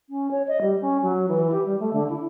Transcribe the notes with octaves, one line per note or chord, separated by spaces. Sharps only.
C#4
C#5
D#5
G3
C#4
F#3
E3
G4
G3
A3
D3
E4